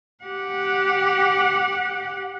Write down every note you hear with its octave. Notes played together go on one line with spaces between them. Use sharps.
G4 F#5